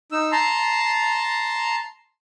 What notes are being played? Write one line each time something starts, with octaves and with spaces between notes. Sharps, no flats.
D#4 E6
A5 A#5 C6